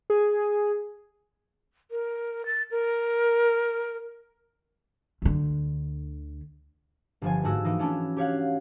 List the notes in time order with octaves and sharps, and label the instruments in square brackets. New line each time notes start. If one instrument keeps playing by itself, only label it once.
[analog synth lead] G#4
[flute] A#4
A6
A#4
[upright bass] D2 D3
[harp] G1 F3 G#5
G#2 A3 F#4 E6
E3 A#3 D#4
A3 C#4 D4 E4
G4 C#5 F5 F#5